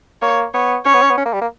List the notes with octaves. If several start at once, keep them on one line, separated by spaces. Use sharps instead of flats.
A#3 C#5
B3 C#5
C#4 C#5
B3
C#4
B3
C#4
A#3
G3
A#3